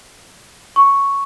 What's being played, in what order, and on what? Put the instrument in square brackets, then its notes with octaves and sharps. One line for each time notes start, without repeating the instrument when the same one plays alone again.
[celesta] C#6